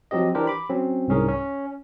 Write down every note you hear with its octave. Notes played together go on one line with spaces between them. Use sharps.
F3 F#3 C4 G4 D#5
E3 D4 G4 A#4 C5
B5 D6
F#3 C4 C#4
C2 G#2 C#4 G#4 A#4
C#4